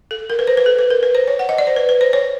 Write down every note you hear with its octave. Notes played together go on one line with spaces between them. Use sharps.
A4
A#4
B4
C5
B4
A4
B4
A#4
B4
C5
C#5
F#5
D#5
D5
C5
B4
B4
C5
C#5